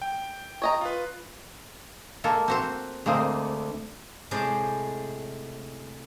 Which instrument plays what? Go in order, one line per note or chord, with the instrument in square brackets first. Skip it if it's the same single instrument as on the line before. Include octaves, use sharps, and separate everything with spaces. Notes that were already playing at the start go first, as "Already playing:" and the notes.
[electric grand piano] G5
[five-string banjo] C#5 D#5 A#5
[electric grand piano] F4 B4
[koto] G#3 A#3 A4
C4 F#4 C5
[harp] D2 F5 D#6 [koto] G#3 A#3 C4
[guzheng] A2 C3 G#3 G#4 C5 D5